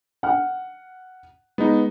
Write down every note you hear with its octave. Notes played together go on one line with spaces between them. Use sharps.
F#5 F6
G#3 B3 D#4